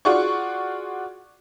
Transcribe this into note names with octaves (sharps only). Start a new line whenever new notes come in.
F4 F#4 G#4 D5 C#6